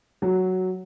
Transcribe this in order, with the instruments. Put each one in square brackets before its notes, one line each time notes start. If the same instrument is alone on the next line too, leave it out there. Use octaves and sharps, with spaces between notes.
[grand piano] F#3